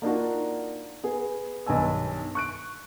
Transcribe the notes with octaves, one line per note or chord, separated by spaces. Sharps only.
A#3 D4 D#4 F4 F#4
B3 G#4
B1 G2 D#3 G#5 E6
C#6 F#6 D7